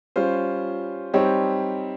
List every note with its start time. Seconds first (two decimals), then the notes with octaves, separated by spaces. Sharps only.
0.16 G3 C#4 F4 C5
1.14 G3 C4 D#4 G4 C#5